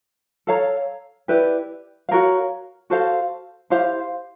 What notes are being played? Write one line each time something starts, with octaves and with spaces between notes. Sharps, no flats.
A4 C#5 F5 A#5
E4 G4 B4 D5
F#4 A#4 C#5 F5
F#4 A4 C5 F5
E4 G4 C5 F5